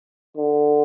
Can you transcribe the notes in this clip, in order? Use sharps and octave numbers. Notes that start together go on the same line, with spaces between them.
D3